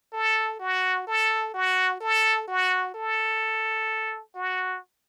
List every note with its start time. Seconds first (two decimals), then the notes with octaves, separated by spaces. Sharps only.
0.13 A4
0.60 F#4
1.07 A4
1.54 F#4
2.01 A4
2.48 F#4
2.95 A4
4.35 F#4